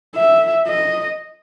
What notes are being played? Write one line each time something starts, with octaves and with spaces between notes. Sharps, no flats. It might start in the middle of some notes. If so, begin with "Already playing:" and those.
E5
D#5